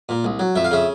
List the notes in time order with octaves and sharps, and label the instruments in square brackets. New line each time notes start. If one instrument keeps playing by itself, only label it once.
[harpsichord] A#2
C2
F#3
F2 E5
F5
C#3 E5